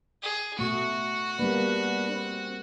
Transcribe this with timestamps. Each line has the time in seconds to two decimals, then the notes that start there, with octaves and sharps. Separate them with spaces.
0.23 G#4
0.59 B2 A3 F#4 C#6
1.39 G3 A#3 B3 D4 B4
2.11 C4